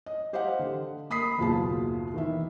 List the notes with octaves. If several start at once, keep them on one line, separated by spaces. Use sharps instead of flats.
D#5
G4 C5 D#5 F5 F#5
D3
A#3 B5 D#6 B6 C7
F#1 D#2 B2 F4 G#4 A5
D#3 E3 E5